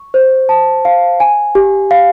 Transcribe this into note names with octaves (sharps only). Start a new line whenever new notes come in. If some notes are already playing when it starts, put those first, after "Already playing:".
Already playing: C#6
C5
A5
F5
G#5
G4
F5